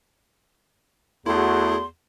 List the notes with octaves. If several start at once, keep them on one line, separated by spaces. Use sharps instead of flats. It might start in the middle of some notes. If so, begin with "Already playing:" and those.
E2 A3 E4 F#4 G#4 C6